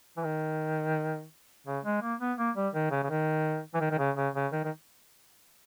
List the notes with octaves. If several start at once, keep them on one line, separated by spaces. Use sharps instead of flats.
E3
D#3
C#3
G#3
A#3
B3
A#3
G3
D#3
C#3
C#3
D#3
E3
D#3
D#3
C#3
C#3
C#3
D#3
D#3